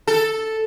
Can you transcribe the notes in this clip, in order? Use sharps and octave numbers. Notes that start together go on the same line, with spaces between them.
A4